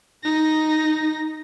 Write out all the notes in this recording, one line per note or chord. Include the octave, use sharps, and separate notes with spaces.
D#4 A#6